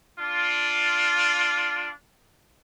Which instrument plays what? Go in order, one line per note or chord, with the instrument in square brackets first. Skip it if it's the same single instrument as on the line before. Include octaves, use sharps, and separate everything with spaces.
[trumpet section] D4 F4